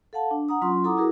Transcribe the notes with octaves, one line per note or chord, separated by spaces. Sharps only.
A4 F5 F#5 A5
D4
F#5 A#5 D#6
F#3 C#4 F4 C6
E4 A4 F#5 A#5 D6 D#6
E4 F#4 G#4 A#4